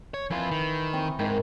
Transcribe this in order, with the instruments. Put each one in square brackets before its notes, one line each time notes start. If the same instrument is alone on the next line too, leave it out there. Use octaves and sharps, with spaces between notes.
[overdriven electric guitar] C#5
[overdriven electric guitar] F2 F4 [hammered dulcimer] E3 E4
[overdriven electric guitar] D#3
[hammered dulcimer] C4 C#6
[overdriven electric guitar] G#2 [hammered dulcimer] D#3